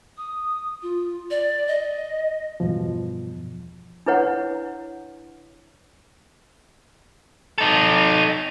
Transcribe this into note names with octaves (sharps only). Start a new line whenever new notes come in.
D#6
F4
D5
D#5
E2 G2 B2 F3
D4 E4 B4 C#5 F#5
D#4 A4